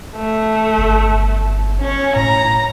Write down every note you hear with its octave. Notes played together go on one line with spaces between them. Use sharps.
A3
G1
C#4 C#5
A2 A#5